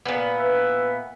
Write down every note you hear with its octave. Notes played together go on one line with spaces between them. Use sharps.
A#2 B3
B4 E5